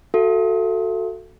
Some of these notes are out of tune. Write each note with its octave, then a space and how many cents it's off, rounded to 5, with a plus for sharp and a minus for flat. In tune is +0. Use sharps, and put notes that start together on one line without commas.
F#4 -5 A4 +10 E5 +45